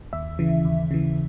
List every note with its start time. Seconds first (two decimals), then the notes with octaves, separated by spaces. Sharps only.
0.13 D#2 E5
0.39 C#3 E3
0.65 D#2
0.91 C#3 E3